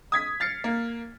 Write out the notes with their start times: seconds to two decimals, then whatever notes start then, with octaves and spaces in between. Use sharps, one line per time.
0.12 D#6 G#6 B6
0.40 F6 A6 C7 C#7
0.64 A#3